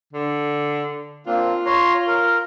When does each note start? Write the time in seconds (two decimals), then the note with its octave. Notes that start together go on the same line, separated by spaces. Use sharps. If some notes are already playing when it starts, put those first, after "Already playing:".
0.13 D3
1.27 A#3 C4 D4 F4
1.66 C#5 A#5 C6
2.07 A#4